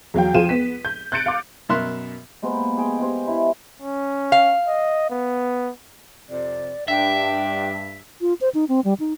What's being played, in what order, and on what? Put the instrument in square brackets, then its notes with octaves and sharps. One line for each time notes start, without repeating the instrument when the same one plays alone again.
[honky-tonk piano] E2 F#3 F5 G5
F3 F4 G#4 G5 D#7 E7
B3 B6
G6
F#6 G6 A6 C#7 D7
F5 D6
[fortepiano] F#2 B2 A#4 E5 C6 F#6
[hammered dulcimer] G#3 A#3 B3 C5
G#4 G5
G#3 G4 C5
E4 F5
[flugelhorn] C#4
[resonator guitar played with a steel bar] F5
[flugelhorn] D#5
B3
[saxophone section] F2 C3 [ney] D5
[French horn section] G2 [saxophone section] D4 [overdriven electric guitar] E5 [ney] G5
[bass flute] F4
C5
D#4
C4
G3
D#4